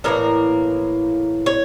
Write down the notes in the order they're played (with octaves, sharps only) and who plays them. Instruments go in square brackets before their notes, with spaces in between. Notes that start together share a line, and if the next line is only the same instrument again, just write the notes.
[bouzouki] A2 E3 A#3 A#4
C#5